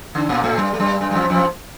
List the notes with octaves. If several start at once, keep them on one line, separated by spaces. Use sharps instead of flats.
D3 D4
A#2 A#3
A2 A3
G2 G3
A3
G2 G3
G2 G3
G3
F2 F3
F2 F3